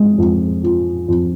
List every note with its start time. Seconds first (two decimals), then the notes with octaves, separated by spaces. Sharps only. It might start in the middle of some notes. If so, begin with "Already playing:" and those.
Already playing: G#3
0.18 F2
0.64 F3
1.08 F2